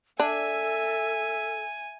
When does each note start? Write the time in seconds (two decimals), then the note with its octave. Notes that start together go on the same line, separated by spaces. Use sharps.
0.20 D4 A4 E5 G#5